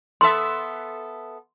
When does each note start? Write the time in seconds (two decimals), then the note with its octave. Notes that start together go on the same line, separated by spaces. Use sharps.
0.21 B3 A4 E5 C6